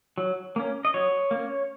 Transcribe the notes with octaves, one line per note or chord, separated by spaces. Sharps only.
F#3
A#3 C#4
D#5
F#3 C#5
A#3 C#4